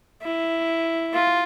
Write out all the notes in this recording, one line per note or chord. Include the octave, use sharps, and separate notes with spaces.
E4
F4